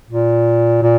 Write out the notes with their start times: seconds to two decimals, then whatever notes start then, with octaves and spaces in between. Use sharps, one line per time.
0.10 A#2
0.82 A#2